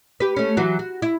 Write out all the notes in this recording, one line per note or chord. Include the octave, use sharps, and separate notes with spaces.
G4 B4
A3 C#4
E3 F#3 F#4
F#4
E4